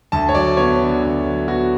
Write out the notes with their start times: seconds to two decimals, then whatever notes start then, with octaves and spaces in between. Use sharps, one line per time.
0.12 D2 A5
0.29 C#5
0.34 F#3 D5
0.57 B3 C#5
0.80 D3
1.03 D2
1.25 F#3
1.48 B3 F#4